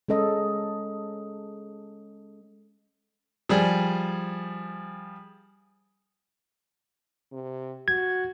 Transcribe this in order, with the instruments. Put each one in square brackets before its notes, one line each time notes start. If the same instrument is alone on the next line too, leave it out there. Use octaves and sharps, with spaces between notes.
[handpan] G#3 C#4 A4 D#5
[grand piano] F3 G3 G#4
[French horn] C3
[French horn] F#4 [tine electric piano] G#6